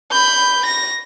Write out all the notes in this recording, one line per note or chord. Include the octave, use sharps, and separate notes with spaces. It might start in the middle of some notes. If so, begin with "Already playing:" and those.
B5 G6
A#6